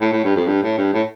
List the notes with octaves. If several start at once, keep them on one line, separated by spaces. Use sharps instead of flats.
A2
A2
G2
F2
G2
A2
G2
A2